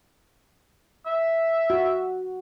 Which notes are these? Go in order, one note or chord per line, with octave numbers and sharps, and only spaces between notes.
E5
F#4